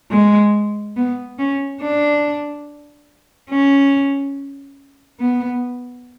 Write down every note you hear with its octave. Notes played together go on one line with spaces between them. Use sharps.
G#3
B3
C#4
D4
C#4
B3